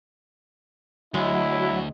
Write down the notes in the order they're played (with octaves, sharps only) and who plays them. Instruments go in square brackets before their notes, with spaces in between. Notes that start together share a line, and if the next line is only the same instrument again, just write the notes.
[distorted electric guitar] D2 [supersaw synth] F#3 [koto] G#3 [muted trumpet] E4